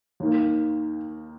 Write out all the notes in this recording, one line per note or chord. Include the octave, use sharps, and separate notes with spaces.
D#2 D#3 A#3